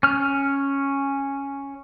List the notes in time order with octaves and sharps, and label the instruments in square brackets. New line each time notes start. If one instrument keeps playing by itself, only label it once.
[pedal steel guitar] C#4 F6